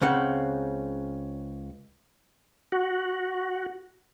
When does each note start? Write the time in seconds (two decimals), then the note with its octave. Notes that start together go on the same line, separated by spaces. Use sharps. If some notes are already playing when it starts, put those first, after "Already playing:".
0.01 C#2 C#3 C4 F#5
2.72 F#4